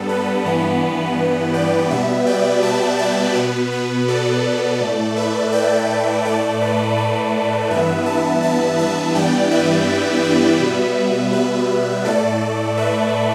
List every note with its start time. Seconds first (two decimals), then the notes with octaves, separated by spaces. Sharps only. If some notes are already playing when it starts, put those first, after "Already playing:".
Already playing: G2 G3 B3 A4
0.09 B4
0.45 G2 E3 B3
1.54 D5 G5
1.90 B2 G3 B3 B4 E5
2.26 D5 G5
2.62 E5 A5
2.98 D5 G5
3.35 B2 B3 B4
3.72 B4
4.08 A4 D5
4.81 A2 A3
5.16 B4 E5
5.52 D5 G5
6.25 A2 A3 A4 D5
6.62 B4
6.97 A4 D5
7.70 G2 E3 B3 B4 E5
8.06 E5 A5
8.42 E5 A5
8.79 E5 A5
9.15 G2 E3 G3 B3 D5 G5
9.51 B4 E5
10.23 B4 E5
10.60 B2 G3 B3
11.33 B4
12.05 A2 A3 A4 D5
12.77 B4 E5